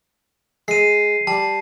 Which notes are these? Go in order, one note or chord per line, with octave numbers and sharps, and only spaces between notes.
G#3 C7 D#7
G3 A5